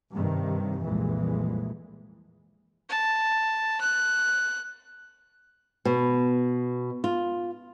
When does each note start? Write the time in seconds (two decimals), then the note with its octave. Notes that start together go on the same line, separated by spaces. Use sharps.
0.15 G2 C3 D#3
0.82 C2 F2 A#2 E3 G#3
2.89 A5
3.81 F#6
5.85 B2
7.04 F4